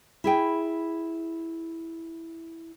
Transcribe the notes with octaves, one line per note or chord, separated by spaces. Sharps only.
E4 G#4 G5